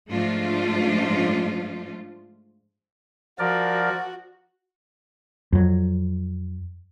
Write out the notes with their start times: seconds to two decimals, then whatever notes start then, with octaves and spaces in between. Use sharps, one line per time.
0.11 G#2 F3 A3 D4 F4
3.39 F3 F#4 A#4 D5
5.52 F2 F#3